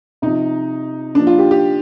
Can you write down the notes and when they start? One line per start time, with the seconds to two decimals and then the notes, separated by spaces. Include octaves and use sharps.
0.22 C3 F3 D#4
1.15 A#2 F3 D4
1.27 F4
1.39 G4
1.51 G4